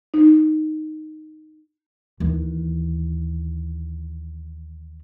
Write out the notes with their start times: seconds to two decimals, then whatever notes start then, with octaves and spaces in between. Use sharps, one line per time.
0.14 D#4
2.20 D#2 E3